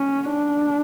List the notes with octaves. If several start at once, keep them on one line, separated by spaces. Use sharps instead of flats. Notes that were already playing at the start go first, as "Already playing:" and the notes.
Already playing: C#4
D4